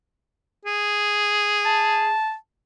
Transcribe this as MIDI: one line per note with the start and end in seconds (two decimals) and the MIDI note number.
0.65 2.14 68
1.66 2.35 81